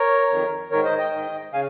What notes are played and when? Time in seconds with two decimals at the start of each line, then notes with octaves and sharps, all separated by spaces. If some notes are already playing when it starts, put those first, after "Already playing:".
Already playing: A#4 C#5
0.30 F2 D#3
0.71 G#2 D#3 A#4 C#5
0.85 C5 D#5
0.98 D#5 G5
1.13 G#2 D#3
1.53 C#3 F5 G#5